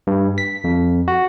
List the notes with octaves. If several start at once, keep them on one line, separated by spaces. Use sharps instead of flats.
G2
B6
F2
F#4